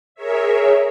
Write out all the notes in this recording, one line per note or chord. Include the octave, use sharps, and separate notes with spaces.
G#4 A#4 C#5 E5